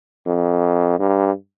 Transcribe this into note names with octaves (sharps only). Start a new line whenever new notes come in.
F2
G2